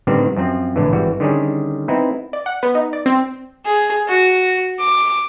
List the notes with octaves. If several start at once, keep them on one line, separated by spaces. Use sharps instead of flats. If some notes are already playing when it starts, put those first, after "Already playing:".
A2 D3 D#3 G3 B3 C4
F#2 F3 C4
A#1 A2 D3 E3
G#1 E3 G3 F#4
D3 D#3 G3 C#4 G#4
B3 C4 D#4 E4
D5
F#5
B3
D#4
D5
C4
G#4
F#4
D6